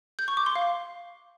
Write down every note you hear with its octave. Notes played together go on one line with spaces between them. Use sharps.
G6
C#6
D6
C6
F5